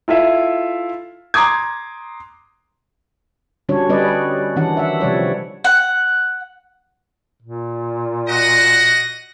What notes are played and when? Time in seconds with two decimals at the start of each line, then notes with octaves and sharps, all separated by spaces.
0.08 E4 F4 A4 E5
1.34 A#5 C6 D6 D#6 G#6
3.69 D3 G3 C#4 D4 F#4 C#5
3.89 G3 C#4 B4 D5 D#5
4.56 D#3 E3 C#4 D4 F#5
4.77 E5 F#5
5.00 C3 F3 G3 C#5 D5
5.64 F#5
7.42 A#2
8.29 F#4 D#5 F#5 A#6